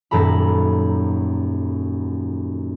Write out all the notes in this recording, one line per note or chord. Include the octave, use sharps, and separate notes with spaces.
D#1 F#2 A4 A#5 B5